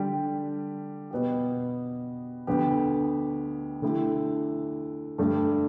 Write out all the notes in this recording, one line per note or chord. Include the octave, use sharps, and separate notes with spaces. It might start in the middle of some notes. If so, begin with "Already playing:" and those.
Already playing: D3 G3 D4 G4
B2 B3 G4
D2 D3 B3 G4
D3 A3 E4 G4
G2 D3 A3 D4 G4